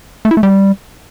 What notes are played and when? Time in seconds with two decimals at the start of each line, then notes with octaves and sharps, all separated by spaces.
0.25 A3
0.31 E4
0.37 A3
0.43 G3